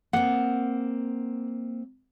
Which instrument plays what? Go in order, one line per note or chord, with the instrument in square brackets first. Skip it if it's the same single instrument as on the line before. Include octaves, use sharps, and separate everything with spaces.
[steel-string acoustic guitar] A#3 C4 [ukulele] F#5